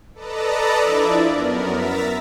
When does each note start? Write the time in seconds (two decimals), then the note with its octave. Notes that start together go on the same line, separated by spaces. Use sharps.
0.14 A4 B4 D5 D#5 A5 A#5
0.79 F3 D4 E4 D5 E5
1.24 F#2 B3 A#4
1.72 E5 A#5 A6 B6